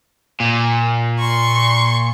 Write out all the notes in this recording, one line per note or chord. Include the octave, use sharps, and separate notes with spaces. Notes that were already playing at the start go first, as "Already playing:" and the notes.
A#2
C6 C#6